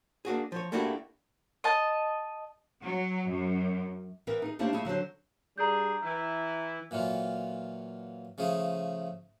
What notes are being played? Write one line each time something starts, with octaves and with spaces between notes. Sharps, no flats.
A#3 D4 F#4 G#4
F3 C#5
A3 A#3 D4 E4 F#4 G4
D#5 A5
F#3
F#2
E3 B3 A#4 E5
D#4 G#4
A3 A#3 D4 E4 G4 C5
A3 A#3 E4 G#4
D3 F#3 F#4 C5
G3 D4 G#4 A#5 G6
E3 E4
A#2 E3 F#3 F4
C#3 F3 A3 G#4